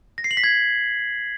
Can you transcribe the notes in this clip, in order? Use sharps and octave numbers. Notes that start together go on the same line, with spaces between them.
A#6
C7
F#7
B6
G#6